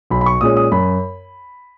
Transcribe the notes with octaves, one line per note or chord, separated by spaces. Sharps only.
B1 B5
B5
C#6
A#2 G#3 C#4 D#6
D#6
F#2 B5